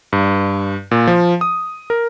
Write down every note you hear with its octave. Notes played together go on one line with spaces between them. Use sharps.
G2
A#2
F3
D#6
A#4